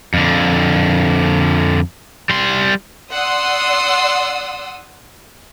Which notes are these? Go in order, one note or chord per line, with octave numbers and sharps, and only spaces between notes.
F2 D3
G3 C6
D5 F#5 C6 D#6 E6